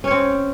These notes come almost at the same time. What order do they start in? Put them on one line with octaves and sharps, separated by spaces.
C#4 C#5 C4